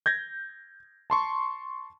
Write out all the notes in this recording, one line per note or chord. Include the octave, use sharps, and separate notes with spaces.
G6 G#6 A#6
A5 C6 C#6